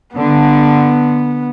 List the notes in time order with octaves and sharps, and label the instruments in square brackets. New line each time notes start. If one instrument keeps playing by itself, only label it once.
[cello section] D3 [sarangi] B3